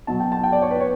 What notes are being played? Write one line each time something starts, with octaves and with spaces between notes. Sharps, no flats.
B2 F#3 A5
G5
A5
G5
D5
C#5
B4
C#5